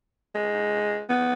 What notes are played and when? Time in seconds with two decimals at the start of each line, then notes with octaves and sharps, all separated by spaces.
0.35 G#3
1.10 B3